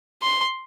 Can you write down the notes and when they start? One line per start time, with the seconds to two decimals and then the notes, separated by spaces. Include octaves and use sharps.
0.22 C6